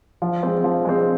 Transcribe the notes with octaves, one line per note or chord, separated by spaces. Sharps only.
F3
G#3 C4
F3
G#3 C4